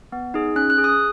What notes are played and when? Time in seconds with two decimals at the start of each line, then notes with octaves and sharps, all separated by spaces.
0.12 B3
0.34 D#4 G#4
0.56 C#4 F#6
0.70 F#6
0.78 G#4
0.84 D#6